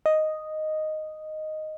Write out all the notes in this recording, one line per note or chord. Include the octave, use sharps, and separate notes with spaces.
D#5